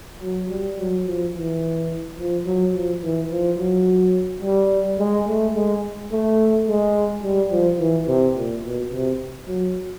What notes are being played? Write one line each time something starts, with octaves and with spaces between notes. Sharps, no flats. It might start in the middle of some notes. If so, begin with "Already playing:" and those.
F#3
G3
F#3
F3
E3
F3
F#3
F3
E3
F3
F#3
G3
G#3
A3
G#3
A3
G#3
G3
F3
E3
C3
A#2
B2
C3
F#3